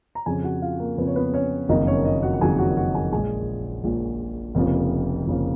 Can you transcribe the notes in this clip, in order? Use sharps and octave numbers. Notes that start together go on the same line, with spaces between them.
A#5
F2 C#3 F3 G#4 G#5
F#4 F#5
F4 F5
A#3 A#4
F2 C#3 F3 B4
C#5
B3 B4
C#4 C#5
F#1 F2 D#3 F#3 A#3 D#4 D#5
C#4 C#5
D#4 D#5
F#4 F#5
F#5
F#1 F2 D#3 F#3 A#3 G#4 G#5
F#4 F#5
F#4 F#5
G#4 G#5
A#1 A#2 F3 G#3 G#4 G#5
A#1 A#2 F3 G#3
F1 F2 C#3 F3 A#3
F1 F2 C#3 F3 A#3